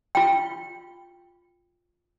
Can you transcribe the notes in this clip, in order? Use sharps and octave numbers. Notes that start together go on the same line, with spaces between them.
F4 G5